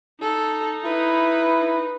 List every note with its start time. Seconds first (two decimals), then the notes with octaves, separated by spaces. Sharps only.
0.21 D#4 A4
0.85 E4 B4